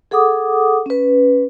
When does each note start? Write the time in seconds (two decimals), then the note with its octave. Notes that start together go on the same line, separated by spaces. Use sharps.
0.11 G#4 A4 F#5 D6 D#6
0.86 C#4 B4